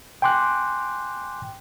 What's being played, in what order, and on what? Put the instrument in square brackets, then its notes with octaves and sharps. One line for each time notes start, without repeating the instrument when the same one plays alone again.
[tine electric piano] G5 G#5 C6 D6 F#6